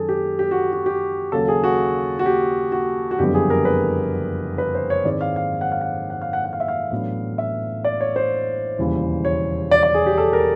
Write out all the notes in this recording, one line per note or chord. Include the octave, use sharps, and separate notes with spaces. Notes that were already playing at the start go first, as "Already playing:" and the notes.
Already playing: F#2 D#3 F#3 G#4 A4
G4
G4
F#4
F#4
G4
D#2 C#3 F#3 A#3 A4
G#4
F#4
F#4
G4
F#4
F#4
F#1 F2 D3 G3 B3 G4
G#4
A#4
B4
B4
C5
C#5
G#2 D#3 G#3 C4 E4 D5
F5
F5
F#5
F5
F#5
F#5
F5
F#5
F#5
F5
E5
F5
A1 A2 F#3 B3 D4
E5
D5
C#5
C5
E1 D#2 C#3 E3 G3
C#5
D5
D5
G#4
G4
A4
A#4